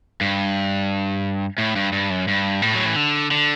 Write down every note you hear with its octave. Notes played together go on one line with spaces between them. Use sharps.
G2
A2
G2
G2
F#2
G2
A2
F#3
E3
D3
D3